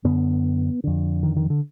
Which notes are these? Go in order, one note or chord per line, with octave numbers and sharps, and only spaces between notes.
F#2 D3 B3
F2 D3
D#3
D#3
D3